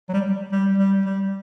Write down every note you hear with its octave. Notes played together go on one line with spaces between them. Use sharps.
F#3
G3
G3
G3
G3